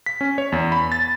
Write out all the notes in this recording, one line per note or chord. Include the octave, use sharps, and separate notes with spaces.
B6
C#4
C#5
E2
B5
A6